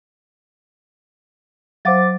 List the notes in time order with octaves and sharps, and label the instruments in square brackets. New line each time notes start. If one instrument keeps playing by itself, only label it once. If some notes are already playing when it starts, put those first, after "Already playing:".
[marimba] F#3 F5 F#5 [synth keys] C5 D6 A6